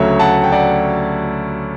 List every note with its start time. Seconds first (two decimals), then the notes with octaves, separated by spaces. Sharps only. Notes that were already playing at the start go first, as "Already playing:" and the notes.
Already playing: D2 C#3 F#3 A3 C#5 E5
0.19 F#5 A5
0.44 G5
0.52 D5 F#5